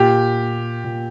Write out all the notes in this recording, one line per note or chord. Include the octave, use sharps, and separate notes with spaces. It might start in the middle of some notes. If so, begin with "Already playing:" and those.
Already playing: A#2 G4
A#2